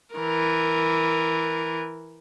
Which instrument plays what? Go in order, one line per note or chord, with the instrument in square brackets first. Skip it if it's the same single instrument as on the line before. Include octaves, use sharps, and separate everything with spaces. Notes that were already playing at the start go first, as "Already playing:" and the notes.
[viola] E3 A#4